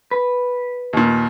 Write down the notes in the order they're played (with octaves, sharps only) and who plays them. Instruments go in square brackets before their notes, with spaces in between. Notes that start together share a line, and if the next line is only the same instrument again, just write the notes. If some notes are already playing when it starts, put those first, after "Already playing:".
[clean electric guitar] B4
[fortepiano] D#2 A#2